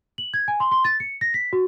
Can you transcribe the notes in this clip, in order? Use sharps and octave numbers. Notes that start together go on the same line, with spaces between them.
F#7
G#6
G#5
C6
C6
A6
C#7
A#6
B6
F#4